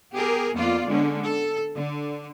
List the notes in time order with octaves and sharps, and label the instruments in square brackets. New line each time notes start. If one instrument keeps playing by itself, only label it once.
[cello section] B3 G4 G#4 A#4
F2 A#3 B3 F4 D5
D3 G#3 B3 C#4
A4
D3